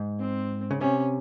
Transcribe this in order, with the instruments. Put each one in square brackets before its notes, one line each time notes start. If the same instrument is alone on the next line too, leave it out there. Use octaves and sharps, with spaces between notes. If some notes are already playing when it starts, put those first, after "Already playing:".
Already playing: [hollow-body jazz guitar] G#2
[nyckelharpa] C4
[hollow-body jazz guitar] C#3
[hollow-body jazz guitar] C3 [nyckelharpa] C#4